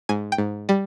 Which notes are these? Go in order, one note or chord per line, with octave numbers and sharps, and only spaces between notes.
G#2 G#5
G5
G#2
G3